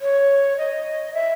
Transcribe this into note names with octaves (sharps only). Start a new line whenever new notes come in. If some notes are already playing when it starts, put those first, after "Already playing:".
C#5
D#5
E5